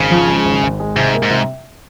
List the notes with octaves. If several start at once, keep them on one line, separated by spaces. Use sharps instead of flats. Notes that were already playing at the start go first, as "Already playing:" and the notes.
Already playing: G#1 C#3
F3
G#3
G#1
G#1
G#3
G#2 C3
A#3
G#2
C3